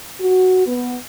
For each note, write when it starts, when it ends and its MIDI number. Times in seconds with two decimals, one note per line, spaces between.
0.20 0.65 66
0.67 0.96 59